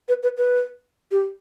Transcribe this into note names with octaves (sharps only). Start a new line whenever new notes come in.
B4
B4
B4
G4